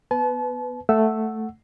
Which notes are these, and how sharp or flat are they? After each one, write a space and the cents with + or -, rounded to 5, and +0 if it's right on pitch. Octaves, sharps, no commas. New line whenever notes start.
B3 +0 B4 +15 A5 -35
A3 +0 F#5 +0 E6 +0